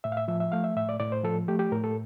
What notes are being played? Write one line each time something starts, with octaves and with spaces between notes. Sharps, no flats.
A2 E5
F5
E5
F3 E5
E5
A3 F5
E5
A2 E5
D5
A2 D5
C5
F3 A4
A3 G4
G4
A2 A#4
A4